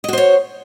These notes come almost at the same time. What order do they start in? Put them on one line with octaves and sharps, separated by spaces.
D#5 F#4 C5 C#5